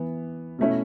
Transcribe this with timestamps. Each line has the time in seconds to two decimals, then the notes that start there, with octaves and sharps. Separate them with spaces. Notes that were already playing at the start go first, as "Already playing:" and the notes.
Already playing: E3 B3
0.59 B2 A3 C#4 E4